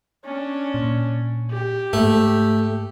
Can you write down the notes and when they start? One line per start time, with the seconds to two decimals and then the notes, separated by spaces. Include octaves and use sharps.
0.24 C#4 D4
0.74 A#2
1.51 G4
1.93 G#2 A3